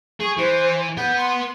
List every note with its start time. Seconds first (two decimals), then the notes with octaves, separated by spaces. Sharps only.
0.21 G#4 C#6
0.38 E3 C5
0.98 B4 F#5 G6
1.18 C6